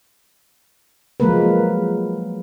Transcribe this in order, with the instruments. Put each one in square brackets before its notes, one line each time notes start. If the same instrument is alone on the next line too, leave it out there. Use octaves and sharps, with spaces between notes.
[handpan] F3 F#3 G#3 A#3 A#4 B4